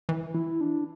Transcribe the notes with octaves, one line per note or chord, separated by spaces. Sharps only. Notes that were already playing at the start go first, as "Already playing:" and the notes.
E3
E4
D4